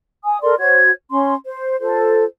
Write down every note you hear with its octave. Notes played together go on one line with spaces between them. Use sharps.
G#5 D#6
A4 A#4 D5 C6
F#4 C5 C#5 G#6
C#4 C6
C5
F4 A4 C5